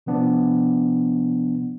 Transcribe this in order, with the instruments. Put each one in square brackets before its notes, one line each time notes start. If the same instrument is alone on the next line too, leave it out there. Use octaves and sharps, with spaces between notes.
[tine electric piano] C3 F3 B3 D4